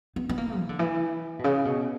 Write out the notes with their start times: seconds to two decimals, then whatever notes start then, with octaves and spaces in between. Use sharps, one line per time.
0.16 B3
0.29 B3
0.38 A#3
0.59 E3
0.69 D3
0.79 E3
1.39 B2
1.44 C#3
1.65 B2